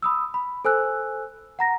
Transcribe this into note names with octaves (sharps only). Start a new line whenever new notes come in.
B5 D#6 E6
B5
A4 C5 G#5 E6 F#6
F#5 A#5 A#6